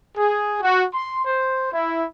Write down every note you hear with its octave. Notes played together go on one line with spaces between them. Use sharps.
G#4
F#4
C6
C5
E4